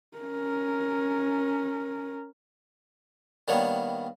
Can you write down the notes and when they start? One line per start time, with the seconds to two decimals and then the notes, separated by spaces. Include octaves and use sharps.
0.18 C#4 A#4
3.48 D#3 G3 A#3 B3 D4 C#5